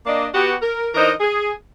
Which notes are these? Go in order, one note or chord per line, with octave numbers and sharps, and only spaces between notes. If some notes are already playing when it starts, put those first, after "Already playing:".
A#3 D4 D#5
B3 F#4 G4
A#4
E3 D4 D#4 A#4 C5 D#5
G#4